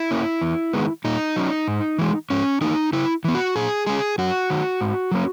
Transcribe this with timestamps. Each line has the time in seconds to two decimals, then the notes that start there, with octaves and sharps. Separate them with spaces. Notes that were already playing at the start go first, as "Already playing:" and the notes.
Already playing: E4
0.11 A#3 C#4
0.42 E2
0.74 D#3 G#3 B3
1.05 A#2 D#4
1.36 F#3 C#4
1.68 G#2
1.99 E3 G#3
2.30 G#2 C#4
2.61 E3 A#3 D#4
2.93 C#3 E4
3.24 E3 B3
3.35 F#4
3.56 A#2 G#4
3.86 G#3 C#4 G#4
4.18 F#2 F#4
4.50 D#3 F#3
4.81 G#2
5.12 F#3 A#3 C#4